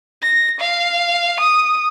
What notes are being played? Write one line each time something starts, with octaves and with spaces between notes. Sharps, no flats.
A#6
F5
D#6